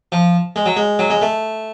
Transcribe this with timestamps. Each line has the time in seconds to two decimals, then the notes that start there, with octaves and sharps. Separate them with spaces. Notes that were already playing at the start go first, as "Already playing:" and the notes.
0.12 F3
0.56 G#3
0.66 F#3
0.76 G#3
0.99 F#3
1.10 G#3
1.22 A3